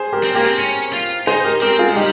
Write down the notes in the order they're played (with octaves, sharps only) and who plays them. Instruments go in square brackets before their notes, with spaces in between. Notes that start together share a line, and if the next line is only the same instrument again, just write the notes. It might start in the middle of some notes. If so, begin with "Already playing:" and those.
Already playing: [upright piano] G#4 C5
G4 A#4
[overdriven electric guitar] C4
[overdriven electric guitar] A#3 [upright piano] G4 A#4
[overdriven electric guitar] C4
C#4
F4
[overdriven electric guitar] D#4 [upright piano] G#4 C5
[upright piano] G4 A#4
[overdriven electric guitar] C4 [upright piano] G4 A#4
[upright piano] F4 G#4
[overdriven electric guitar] G#3
[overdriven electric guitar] G3 [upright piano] D#4 G4